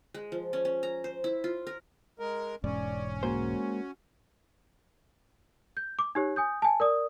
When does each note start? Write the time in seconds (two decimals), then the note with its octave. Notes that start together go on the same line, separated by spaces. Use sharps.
0.14 G#3
0.32 F3
0.53 C#4
0.65 C#4
0.83 A#5
1.04 C5
1.24 E4
1.44 F4
1.67 A#4
2.19 G#3 A#4
2.64 E1 G#2 C#4 D5
3.23 G#3 A#3 F#4 C5
5.77 G6
5.99 D6
6.15 D#4 G4 C#5
6.36 G#5 D#6 G6
6.62 G#5 A5
6.80 A#4 D5 D#6